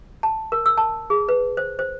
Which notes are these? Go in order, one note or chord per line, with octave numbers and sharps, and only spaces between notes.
A5
A#4
E6
A5
G#4
B4
C5
C5